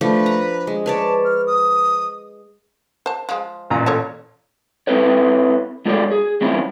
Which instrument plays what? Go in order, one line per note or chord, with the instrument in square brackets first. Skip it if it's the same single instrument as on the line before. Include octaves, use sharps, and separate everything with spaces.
[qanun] F3 A3 D4 [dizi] B4
[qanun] A#5
G#3
[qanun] B4 C#5 D5 [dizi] A5
[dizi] F6
D#6
[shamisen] C5 A5
F3 G#3
[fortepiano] A1 A#2 A#5
[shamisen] A4 C#5 A5
[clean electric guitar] C4 E4 A4 B4 C#5
G#3 F4 F#4 A4 C#5 D5
G#4
E3 G3 C4 C#4 E4 F4